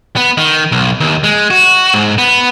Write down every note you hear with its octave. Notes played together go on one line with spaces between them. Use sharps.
B3
D#3
B1
D#2
G#3
F#4
G#2
B3